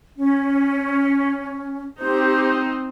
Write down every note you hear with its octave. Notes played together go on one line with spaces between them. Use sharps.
C#4
C4 D#4 G4 C5 G6